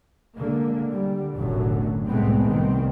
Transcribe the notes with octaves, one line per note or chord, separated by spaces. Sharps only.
D3 G#3 A#3
D3 G3
F1 B1 F#2 A2 D3 F#3
C2 A2 G#3 A3 B3 C4
C2 C3 D#3 C4